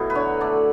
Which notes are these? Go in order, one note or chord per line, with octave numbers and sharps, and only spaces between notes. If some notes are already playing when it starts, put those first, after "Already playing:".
Already playing: B2 F#3 A3 E4
B4
D3 C#5
A3 D5